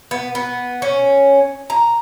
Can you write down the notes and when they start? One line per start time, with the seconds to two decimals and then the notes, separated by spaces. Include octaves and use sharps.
0.11 B3
0.35 B3
0.82 C#4
1.70 A#5